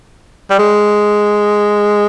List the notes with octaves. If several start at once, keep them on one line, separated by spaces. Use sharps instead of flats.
G3
G#3